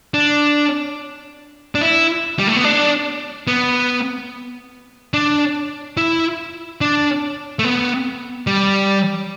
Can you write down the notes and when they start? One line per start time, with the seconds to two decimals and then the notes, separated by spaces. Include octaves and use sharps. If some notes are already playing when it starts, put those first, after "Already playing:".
0.14 D4
1.75 D4
1.81 E4
2.39 G3
2.47 A3
2.56 B3
2.64 D4
3.47 B3
5.14 D4
5.97 E4
6.81 D4
7.59 A3
7.65 B3
8.47 G3